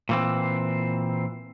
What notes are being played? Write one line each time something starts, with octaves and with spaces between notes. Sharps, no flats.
A#2 E3 C4